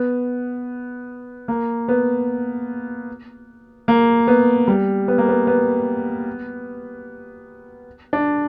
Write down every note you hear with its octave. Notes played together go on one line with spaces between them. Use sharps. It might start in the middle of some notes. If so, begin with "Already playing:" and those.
Already playing: B3
A#3
B3
A#3
B3
G3
B3
A#3
B3
B3
D4